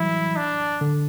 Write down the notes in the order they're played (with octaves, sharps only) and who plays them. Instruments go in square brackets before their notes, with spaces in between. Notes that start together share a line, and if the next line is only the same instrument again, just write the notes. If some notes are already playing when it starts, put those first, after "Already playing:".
Already playing: [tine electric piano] E3 F#3 G3 [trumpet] E4
[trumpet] D4
[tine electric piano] D3